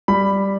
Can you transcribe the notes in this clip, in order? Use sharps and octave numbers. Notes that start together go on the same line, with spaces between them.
G3 B5